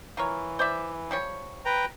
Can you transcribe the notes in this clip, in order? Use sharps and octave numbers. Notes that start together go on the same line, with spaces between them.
E3 F4 A#4 C#5
C5 D5 E5
F3 G3 C#5
B4 G5 A#5